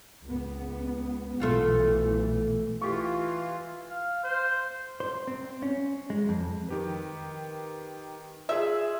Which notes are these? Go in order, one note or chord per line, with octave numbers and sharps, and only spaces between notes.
C#2 B3
B1 B2 E3 A3 F4 F#4
E3 F4 G4 C#6
F5
C5
C5
C4
C#4
G#3
F2
D#3 G4 B4
F4 G#4 E5